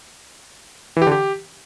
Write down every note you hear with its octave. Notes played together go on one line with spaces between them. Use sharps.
E3
G4
D3
G4